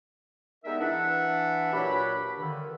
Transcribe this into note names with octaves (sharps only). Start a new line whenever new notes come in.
G3 G#3 B3 D#4 A#4 E5
E3 D4 E5 F#5
A#2 F#3 D4 G4 B5
G2 D3 D#3